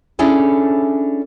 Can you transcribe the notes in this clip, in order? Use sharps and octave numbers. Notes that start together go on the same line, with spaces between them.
C#4 D4 E4 G#4 A4 C#5